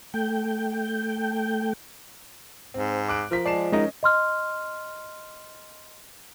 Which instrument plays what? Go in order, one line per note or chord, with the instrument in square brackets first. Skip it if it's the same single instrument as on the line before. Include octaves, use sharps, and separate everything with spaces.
[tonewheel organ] A3 G5
[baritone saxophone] G#2 [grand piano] C4
[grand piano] D6 F#6 D7
[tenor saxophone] F3 [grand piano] A#4 B6
[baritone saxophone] G#3 [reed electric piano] D5 [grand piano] A5 C7 E7
[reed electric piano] G#3 D#4 A#4 [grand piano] C#4 D#5
[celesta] D#5 C6 F6